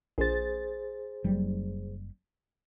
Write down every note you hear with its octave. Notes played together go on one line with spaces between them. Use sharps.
A#1 G#4 C5 A6
F#1 F#3 G3